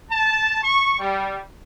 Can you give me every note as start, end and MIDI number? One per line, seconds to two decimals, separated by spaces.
0.11 0.58 81
0.63 0.96 85
0.99 1.39 55